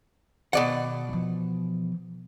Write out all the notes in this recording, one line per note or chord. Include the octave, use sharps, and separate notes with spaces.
B2 D#3 D5 F#5
E3 F3